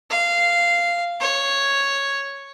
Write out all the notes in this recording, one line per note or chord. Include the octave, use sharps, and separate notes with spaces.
F5
C#5